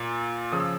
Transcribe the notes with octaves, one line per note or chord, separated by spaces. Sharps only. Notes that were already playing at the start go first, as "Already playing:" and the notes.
Already playing: A#2
C#3 F3 D#6
E6